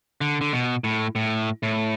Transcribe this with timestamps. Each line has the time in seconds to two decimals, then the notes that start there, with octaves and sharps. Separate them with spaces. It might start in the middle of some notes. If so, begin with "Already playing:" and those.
0.21 D3
0.41 D3
0.52 B2
0.84 A2
1.15 A2
1.63 A2